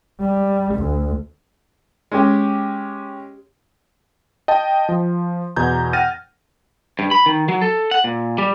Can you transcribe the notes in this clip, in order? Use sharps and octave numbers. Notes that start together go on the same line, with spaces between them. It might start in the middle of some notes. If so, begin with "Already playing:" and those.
G3
D2
G#3 C#4 G4
D#5 G5 A5
F3
E2 B2 A#5 G6 G#6
F#5 G5 F6 A6 A#6 D#7
G2
B5
D#3
F#3
A4
F#5
A#2
G3